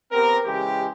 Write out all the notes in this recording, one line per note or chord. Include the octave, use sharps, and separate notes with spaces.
B3 C4 G4 A#4
C#3 E3 G#3 G4